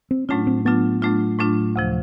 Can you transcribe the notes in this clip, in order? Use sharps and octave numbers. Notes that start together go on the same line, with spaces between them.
C4
A2 F#3 A3 C#4 D4 F4
C4
A2 F#3 A3 B3 D4 F4
A2 F#3 A3 D4 F4
A2 F#3 A3 D4 F4
D2 C3 F3